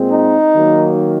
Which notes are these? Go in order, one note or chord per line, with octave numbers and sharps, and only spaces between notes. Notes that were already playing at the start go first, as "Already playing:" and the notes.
Already playing: A#2 G#3 C4
D#4
D#3 F#3 A#3